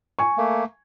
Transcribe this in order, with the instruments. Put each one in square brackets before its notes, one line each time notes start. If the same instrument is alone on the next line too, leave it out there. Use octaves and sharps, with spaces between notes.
[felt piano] G#5 C#6
[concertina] A3 A#3